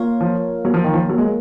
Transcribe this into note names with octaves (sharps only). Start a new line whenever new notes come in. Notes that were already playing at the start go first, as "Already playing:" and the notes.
Already playing: A#3 F4 A#4 C#5 F5
F3
F#3
F3
D#3
F3
F#3
G#3